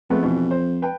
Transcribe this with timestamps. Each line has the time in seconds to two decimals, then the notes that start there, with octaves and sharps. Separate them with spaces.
0.10 F2 G#3 A3 B3
0.23 B2 E3
0.51 C5
0.82 B4 G5 A5